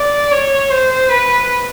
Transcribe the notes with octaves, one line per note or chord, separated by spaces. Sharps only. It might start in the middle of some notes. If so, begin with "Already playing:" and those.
Already playing: D5
C#5
C5
B4